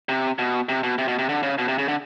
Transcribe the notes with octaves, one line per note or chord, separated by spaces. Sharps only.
C3
B2
C3
B2
C3
B2
C3
D3
C#3
B2
C3
C#3
D3